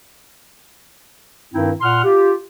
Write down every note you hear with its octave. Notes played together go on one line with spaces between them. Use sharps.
G2 D#3 C4 D#4 E4
A#2 F#5 C6 F6
F4 G4